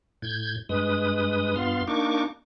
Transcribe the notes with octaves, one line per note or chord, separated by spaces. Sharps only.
A2 G6 G#6
G2 G#3 B4 D#6
G2 B3 F4 F5 C6
A#3 D4 D#4 C#6 D6